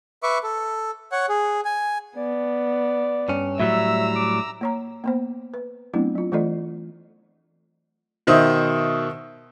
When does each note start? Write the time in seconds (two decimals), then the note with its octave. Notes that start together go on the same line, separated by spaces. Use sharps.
0.23 B4 E5 C#6 D6
0.43 A4
1.12 C#5 F#5
1.29 G#4
1.65 G#5
2.17 B3 D5
3.28 G2 C#4
3.60 A2 F#3 G3 E5 A#5 E6
4.16 D6
4.61 A#3 C#5 A#5
5.04 A#3 B3 C5
5.54 B4
5.94 F#3 A3 B3 C4 D4 E4
6.15 F#3 F4
6.32 E3 A3 F4 A4 D5 D#5
8.27 B2 D#3 C5 E5 D#6